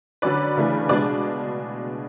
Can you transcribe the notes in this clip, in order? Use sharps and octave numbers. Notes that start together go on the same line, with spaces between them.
D3 F#3 C#4 B4 D5
C#3 E3 A3 D4
B2 G#3 D4 B4 D5